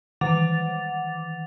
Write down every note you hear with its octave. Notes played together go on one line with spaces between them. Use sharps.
D#3 E3 F#5 D6 A6 F7